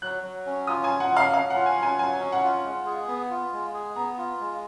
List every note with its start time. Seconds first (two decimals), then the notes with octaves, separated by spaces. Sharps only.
0.02 F#3 F#6
0.23 F#3
0.46 C#4
0.67 F4 D#6
0.84 G#5
0.89 F#3
1.00 F#5
1.11 F#3
1.17 F5
1.33 C#4 F5
1.50 F4 F#5
1.66 G#5
1.77 F#3
1.83 G#5
1.99 F#3 G#5
2.20 C#4
2.32 F#5
2.43 F4
2.65 G#3
2.86 G#4
3.08 B3
3.30 F4
3.53 G#3
3.74 G#4
3.96 B3 A#5
4.18 F4
4.40 G#3